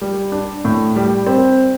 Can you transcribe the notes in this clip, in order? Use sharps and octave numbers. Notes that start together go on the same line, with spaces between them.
G3
D4
A2
G3
C4